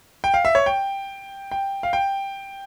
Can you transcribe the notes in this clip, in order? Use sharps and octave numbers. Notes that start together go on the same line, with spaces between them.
G5
F5
E5
C#5
G5
G5
F5
G5